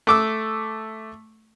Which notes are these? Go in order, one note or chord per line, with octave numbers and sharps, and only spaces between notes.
A3 D6 E6